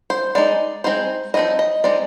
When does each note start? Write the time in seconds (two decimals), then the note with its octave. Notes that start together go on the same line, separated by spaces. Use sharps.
0.10 C5
0.35 G#3 D#4 D5
0.84 G#3 C4 D#4 C5
1.34 F3 C4 D#4 D#5
1.59 D#5
1.84 G#3 C4 D#4 D5